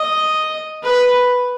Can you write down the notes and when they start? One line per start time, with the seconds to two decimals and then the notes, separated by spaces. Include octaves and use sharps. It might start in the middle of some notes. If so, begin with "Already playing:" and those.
Already playing: D#5
0.83 B4